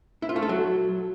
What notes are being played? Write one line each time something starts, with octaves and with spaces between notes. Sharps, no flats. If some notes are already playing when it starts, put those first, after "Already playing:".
E4
F4
A3
A4
F#3